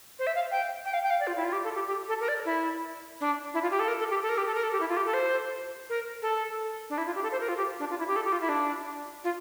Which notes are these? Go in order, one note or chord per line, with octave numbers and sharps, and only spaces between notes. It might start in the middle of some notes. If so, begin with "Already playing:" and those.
C5
E5
F5
G5
G5
F5
G5
F5
D5
F4
E4
F4
G4
A4
G4
G4
A4
A#4
D5
E4
D4
E4
F4
G4
A4
A#4
A4
G4
A4
A#4
G4
A4
A#4
A4
G4
E4
F4
G4
A4
C5
A#4
A4
D4
E4
F4
G4
A4
C5
A#4
F4
G4
D4
F4
E4
G4
A4
G4
F4
E4
D4
F4